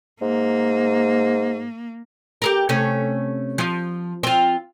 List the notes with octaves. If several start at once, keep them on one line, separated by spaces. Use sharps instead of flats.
G#2 A#3
G4 A4 A#4
C3 A3 C#4
F3
C4 F4